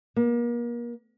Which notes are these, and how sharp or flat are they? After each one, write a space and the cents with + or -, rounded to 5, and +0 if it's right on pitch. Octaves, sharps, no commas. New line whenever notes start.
A#3 +35